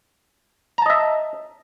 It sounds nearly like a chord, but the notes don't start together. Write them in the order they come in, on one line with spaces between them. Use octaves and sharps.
A#5 A5 D#5 E5